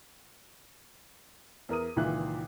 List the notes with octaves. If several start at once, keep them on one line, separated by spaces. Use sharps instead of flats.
E2 A#4 D#6 D#7
C#2 A#2 D#3 E3 E5 F#6